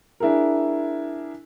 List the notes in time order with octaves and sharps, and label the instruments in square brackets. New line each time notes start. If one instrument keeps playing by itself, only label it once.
[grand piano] D4 E4 G#4 A#4